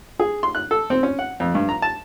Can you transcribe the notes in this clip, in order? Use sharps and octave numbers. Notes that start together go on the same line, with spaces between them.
G#4
C6
F#6
A4
C4
C#4
F#5
F2
G2
A#5
A5